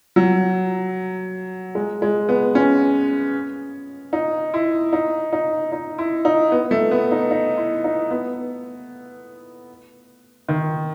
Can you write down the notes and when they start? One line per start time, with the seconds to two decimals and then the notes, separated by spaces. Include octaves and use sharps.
0.16 F#3
1.75 G#3
2.02 G#3
2.29 B3
2.55 C#4
4.13 D#4
4.54 E4
4.93 D#4
5.33 D#4
5.72 D#4
5.98 E4
6.25 D#4
6.52 B3
6.71 A3
6.91 B3
7.11 D#4
7.31 D#4
7.57 E4
7.84 D#4
8.11 B3
10.49 D#3